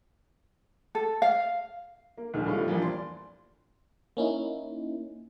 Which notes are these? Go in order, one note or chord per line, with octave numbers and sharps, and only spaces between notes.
A4
F5
A#3
A#1 D#2 D#3 G#4 F6
A2 D#3 G3 C4 F4
E3 F3 G3 A#3 D4 G4
E2 D5 C6
A#3 C#4 D#4 E4